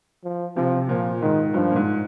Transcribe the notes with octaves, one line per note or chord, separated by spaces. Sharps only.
F3
C3 F3
A#2 F3
G#2 D#3
G2 F3
A#2
G#2